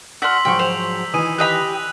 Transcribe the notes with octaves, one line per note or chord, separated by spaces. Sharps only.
F#4 D5 C6 E6 F6 B6 F#7
G#2 F3 F#3 G5 C#6
C5 F7
D#3 E3 G#5 D#6 D#7
G4 D#5 B5 F#6 F7